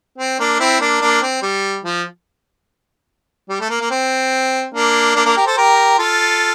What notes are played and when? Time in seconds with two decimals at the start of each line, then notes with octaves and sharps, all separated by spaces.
0.18 C4
0.40 A#3 D4
0.60 C4 E4
0.80 A#3 D4
1.01 A#3 D4
1.22 C4
1.42 G3
1.85 F3
3.49 G3
3.61 A3
3.70 A#3
3.81 A#3
3.91 C4
4.74 A#3 D4
5.15 A#3 D4
5.25 A#3 D4
5.37 G4 A#4
5.46 A4 C5
5.57 G4 A#4
5.98 F4 A4